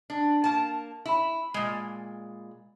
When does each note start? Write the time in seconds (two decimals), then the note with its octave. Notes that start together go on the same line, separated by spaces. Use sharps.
0.10 D4
0.44 A#3 A5
1.06 E4 B5 E6
1.54 A#2 G#3